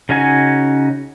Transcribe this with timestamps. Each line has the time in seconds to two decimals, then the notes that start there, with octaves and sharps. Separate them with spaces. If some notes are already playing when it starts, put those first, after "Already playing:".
0.09 C#3 C#4 D#4 F#4 G#5